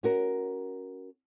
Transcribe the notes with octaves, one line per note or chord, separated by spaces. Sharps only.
C#4 F#4 A#4